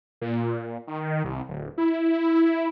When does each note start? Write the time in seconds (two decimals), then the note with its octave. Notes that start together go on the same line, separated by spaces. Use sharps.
0.21 A#2
0.88 D#3
1.24 C2
1.49 D1
1.78 E4